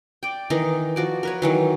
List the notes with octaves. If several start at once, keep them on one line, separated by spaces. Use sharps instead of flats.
D5 G5
D#3 E3 D#4 A#4
F3 F#4 D5
A#4 B4 C#5
D#3 E3 F#3